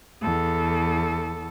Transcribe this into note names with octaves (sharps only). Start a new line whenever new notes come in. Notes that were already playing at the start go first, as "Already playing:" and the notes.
E2 A4